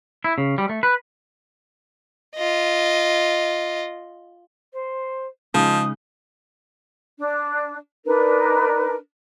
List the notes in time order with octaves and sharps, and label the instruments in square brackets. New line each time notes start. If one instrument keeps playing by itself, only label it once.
[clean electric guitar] E4
C#3
G3
A3
B4
[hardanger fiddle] F4 D#5
[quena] C5
[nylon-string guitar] C#3 G#3 D#4 [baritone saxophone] F3 [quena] D#6
[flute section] D4
D4 D#4 A#4 B4